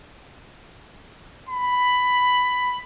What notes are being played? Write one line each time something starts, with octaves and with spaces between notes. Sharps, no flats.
B5